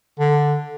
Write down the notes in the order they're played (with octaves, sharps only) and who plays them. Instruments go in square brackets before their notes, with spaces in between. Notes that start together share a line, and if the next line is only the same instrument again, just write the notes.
[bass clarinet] D3